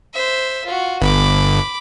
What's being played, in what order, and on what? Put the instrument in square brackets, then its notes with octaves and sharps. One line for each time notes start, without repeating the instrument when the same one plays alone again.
[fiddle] C5 E5
F4 F#4
[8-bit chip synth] G1 [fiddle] B5 D6